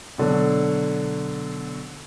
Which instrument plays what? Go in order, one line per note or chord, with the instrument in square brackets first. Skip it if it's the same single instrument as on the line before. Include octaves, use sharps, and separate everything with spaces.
[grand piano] B2 D3 F#3